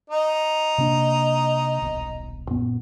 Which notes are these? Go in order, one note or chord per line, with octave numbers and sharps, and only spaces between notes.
D#4
C3 A#3 D4
D#1 B1
F#2 A#2 B3